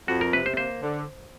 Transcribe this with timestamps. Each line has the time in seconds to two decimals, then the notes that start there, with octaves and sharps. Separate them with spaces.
0.08 F2 F#4
0.21 A#4
0.33 C3 B4
0.46 C5
0.57 A#3 C5
0.82 D3